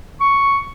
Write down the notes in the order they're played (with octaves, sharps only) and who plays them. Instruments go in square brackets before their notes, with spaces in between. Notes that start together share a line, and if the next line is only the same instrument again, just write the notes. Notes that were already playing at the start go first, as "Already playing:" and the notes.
[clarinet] C#6